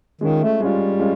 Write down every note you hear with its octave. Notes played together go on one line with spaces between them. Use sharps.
D#3 G#3 C#4 F4
A3
G3 G#3 C#4 F4
G#3 C#4 F4